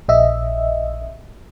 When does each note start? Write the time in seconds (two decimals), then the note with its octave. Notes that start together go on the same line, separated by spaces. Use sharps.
0.08 A#1 D#5 E5